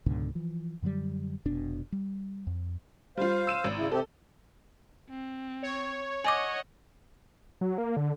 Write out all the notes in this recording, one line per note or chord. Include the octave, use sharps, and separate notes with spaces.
C#2 G#2 B2 D3
E3 F3
F#2 D3 F#3 G3
F1 B2 D4
G3
F2
G3 F4 C5 F5
E6 D#7 E7
G#1
C#3 E4
C3 C4 G4 A4
C4
C#5
D#5 F#5 G#5 D6
F#3
A#3
D3